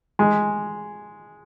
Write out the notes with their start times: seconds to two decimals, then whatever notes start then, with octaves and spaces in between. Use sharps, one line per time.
0.19 G#3